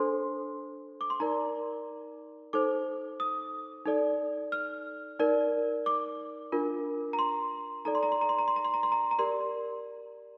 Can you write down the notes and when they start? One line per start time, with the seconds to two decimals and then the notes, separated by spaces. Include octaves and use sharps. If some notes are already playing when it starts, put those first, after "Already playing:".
Already playing: D4 A4 C5 C6
1.01 D6
1.10 C6
1.20 D#4 A#4 D5 A#5
2.53 D#4 A4 C5 D6
3.20 D#6
3.86 D#4 A4 D5
4.52 F6
5.19 D#4 A#4 D5
5.86 D6
6.52 D4 F4 A#4
7.13 A#5
7.19 C6
7.85 D#4 A4 D5 A#5
7.95 C6
8.03 A#5
8.12 C6
8.21 A#5
8.29 C6
8.39 A#5
8.48 C6
8.56 A#5
8.65 C6
8.74 A#5
8.83 C6
8.92 A#5
9.11 A#5
9.19 G4 A#4 D5 C6